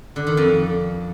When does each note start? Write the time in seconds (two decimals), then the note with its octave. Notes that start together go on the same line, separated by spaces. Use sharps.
0.16 D3
0.27 D#3
0.37 F2